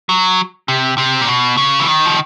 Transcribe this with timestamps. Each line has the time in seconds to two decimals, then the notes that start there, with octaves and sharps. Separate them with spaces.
0.09 F#3
0.68 C3
0.98 C3
1.21 A#2
1.28 B2
1.57 C#3
1.79 E3
1.88 D#3
2.05 F3